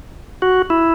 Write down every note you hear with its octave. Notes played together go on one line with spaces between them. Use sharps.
F#4
E4